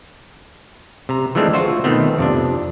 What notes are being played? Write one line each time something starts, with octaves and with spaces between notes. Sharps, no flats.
C3 A#5
E3 F3 G#3 A3 C4 D4
F4 F#4 C5 E5
B2 D#3 A3 B3 C4
F2 C3 D4